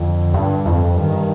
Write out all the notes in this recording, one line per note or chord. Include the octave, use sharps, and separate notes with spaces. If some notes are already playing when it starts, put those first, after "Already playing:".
Already playing: F2 D3
G2
F2
G2 D#3